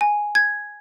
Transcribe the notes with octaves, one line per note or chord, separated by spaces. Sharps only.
G#5
G#6